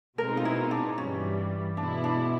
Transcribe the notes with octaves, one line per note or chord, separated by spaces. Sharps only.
B2 G#3 C4 D#4 A#4
F4
E4
D4
G2 E3 G3 C#4
B2 G#3 B3 D4 E4
D4